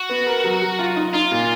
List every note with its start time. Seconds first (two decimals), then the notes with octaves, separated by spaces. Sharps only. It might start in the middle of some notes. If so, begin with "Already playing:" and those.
Already playing: F#4
0.09 B3
0.26 A#4
0.44 F#3
0.62 F#3
0.79 F4
0.96 D#4
1.13 D#4 F4
1.31 A#2